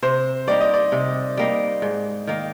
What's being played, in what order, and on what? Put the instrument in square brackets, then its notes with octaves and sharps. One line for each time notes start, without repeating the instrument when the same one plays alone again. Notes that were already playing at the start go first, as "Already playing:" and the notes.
[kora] C3 [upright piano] C5
[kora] G3 A#3 D#4 [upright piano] D5
[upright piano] D#5
D5
[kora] C3
G3 A#3 D#4
G#2
D#3 A#3